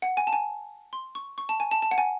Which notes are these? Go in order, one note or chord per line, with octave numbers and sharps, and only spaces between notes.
F#5
G#5
A5
G#5
C6
C#6
C#6
A5
G#5
A5
A5
F#5
G#5